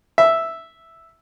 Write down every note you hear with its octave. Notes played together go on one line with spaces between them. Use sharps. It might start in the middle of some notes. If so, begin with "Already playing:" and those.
E5